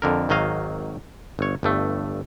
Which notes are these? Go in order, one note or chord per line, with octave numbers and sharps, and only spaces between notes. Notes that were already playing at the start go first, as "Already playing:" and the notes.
F2 D3 A#4
G#1 D#3 F#3 D#5 F5
G1 C#5
G1 G2 A3